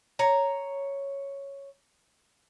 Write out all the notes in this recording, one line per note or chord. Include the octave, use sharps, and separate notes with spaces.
C#5 A#5